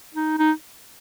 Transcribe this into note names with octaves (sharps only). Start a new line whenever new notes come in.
D#4
D#4